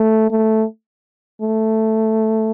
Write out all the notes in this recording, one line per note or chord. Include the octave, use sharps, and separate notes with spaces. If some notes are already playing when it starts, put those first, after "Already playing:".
Already playing: A3
A3
A3